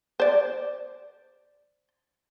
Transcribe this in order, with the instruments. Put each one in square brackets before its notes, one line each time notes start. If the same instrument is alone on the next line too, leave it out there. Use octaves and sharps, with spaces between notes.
[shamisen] C5 D5